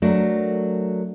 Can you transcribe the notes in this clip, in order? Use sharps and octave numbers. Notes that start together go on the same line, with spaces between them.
F#3 A3 D4 A#4